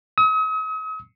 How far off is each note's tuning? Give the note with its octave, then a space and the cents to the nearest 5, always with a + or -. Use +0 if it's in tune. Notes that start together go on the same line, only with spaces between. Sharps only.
D#6 +45